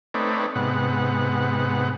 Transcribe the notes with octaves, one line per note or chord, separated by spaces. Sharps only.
A3 C4 D#4 B4 C#5 D5
G#2 C3 B3 F#5